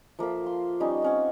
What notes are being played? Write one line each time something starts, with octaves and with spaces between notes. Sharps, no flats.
F3 A#3 A4 E5
C6
G3 C#4 D#4
C4 C#4 F#5